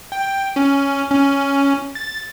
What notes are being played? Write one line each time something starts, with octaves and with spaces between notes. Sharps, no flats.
G5
C#4
C#4
A6